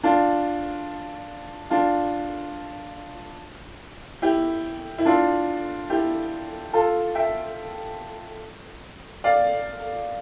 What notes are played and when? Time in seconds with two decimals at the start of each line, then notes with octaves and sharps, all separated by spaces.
0.03 D4 F4
1.70 D4 F4
4.22 E4 G4
4.98 E4
5.05 D4 F4
5.90 E4 G4
6.73 F4 A4
7.15 E5 G5
9.24 D5 F5